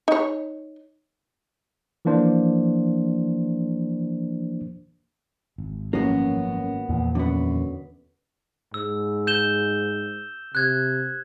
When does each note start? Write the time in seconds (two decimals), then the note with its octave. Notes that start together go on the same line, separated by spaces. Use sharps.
0.08 D#4 C#5
2.05 E3 F3 A#3 D4 C5
5.58 G#1
5.93 F#2 F3 A#3 B3 C#4
6.89 E2 A#2 F3
7.15 F#2 D3 B3
8.74 G#2 E6
9.27 G6 E7 G7
10.55 C3 F#6 G#6